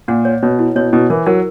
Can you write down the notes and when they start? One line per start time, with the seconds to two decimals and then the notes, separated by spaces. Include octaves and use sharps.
0.08 A#2 F#5
0.25 C#5
0.42 B2 C#5
0.59 E4
0.76 B2 C#5
0.93 B2 E4
1.10 E3 A#4
1.26 F#3 A#4